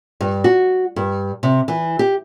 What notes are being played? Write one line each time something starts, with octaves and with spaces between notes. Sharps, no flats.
G2
F#4
G2
C3
E3
G4